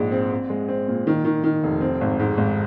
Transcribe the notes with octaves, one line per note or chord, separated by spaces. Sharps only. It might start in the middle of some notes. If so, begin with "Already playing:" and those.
Already playing: A#1 G#2 G#3
C4
C4
G#3
C4
A#2
D#3
D#3
D#3
F1
C4
G#1
G#2
G#1